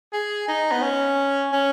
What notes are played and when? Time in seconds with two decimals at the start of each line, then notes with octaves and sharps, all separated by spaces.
0.13 G#4
0.48 D#4
0.72 B3
0.83 C#4
1.53 C#4